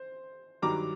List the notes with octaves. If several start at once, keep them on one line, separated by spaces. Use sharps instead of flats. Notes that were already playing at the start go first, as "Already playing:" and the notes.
Already playing: C5
G2 D#3 F#3 A#5 D6